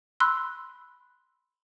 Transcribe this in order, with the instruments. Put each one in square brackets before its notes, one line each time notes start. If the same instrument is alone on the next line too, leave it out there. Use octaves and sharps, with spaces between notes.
[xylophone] B5 C6 E6 F#6